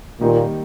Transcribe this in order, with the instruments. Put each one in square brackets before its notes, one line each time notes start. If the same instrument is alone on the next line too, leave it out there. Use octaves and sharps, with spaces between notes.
[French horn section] A#2 [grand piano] D#3 G3 A#3 D#4